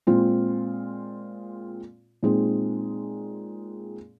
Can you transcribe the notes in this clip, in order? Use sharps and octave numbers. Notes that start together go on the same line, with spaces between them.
A#2 G#3 C4 F4
A#2 G#3 C4 D#4 G#4